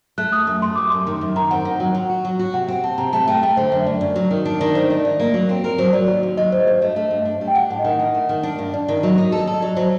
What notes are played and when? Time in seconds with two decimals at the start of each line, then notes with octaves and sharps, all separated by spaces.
0.18 A3 F#6
0.32 A3 D#6
0.47 F#2 D#6
0.62 A3 C6
0.76 G3 D6
0.90 F#2 C6
1.07 D#3
1.21 F#2
1.36 D#3 A#5
1.51 C4 F#5
1.65 D#3
1.80 F#3 F#5
1.95 F#3
2.10 F#4
2.25 F#3
2.39 F#4
2.54 C3 F#5
2.68 C4
2.84 C4 A5
2.98 C3 A#5
3.13 A3 A5
3.28 A3 G5
3.42 A3 G5
3.57 D3 C5
3.72 F#2 C5
3.86 F#2 D5
4.01 F#2 D5
4.16 F#3
4.31 D#3
4.45 D4
4.60 D#3 D5
4.75 A3 C5
4.89 D#4 D5
5.05 D#4 D5
5.20 A#3
5.34 F#3
5.49 C4
5.64 A#4
5.78 F#3 C5
5.93 F#3 D5
6.08 D#2
6.23 D#2
6.37 F#3 D#5
6.52 D#2 C5
6.67 G2 C5
6.82 A3 D#5
6.96 A3
7.11 G2
7.25 D4
7.41 G3
7.48 G5
7.55 D4 F#5
7.70 A2 F#5
7.79 D#5
7.85 D#3 F#5
8.00 D#4
8.15 A3
8.29 D#3
8.43 D4
8.59 G2
8.73 G2 D5
8.88 D#3 D5
9.03 F#3 D#5
9.18 D#4
9.32 A4
9.47 A4
9.53 D#5
9.61 F#3 D5
9.77 F#3 C5